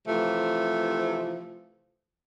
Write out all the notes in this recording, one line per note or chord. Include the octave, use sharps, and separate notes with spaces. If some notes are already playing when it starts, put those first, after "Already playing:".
C3 E3 F3 A3